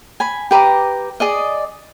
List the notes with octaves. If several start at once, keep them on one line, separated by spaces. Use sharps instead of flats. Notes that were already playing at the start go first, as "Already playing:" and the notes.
G#5 B5
G4 B4 A#5 D6
G#4 D5 D#5